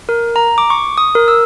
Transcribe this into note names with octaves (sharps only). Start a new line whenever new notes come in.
A#4
A#5
D6
C#6
D#6
A#4
E6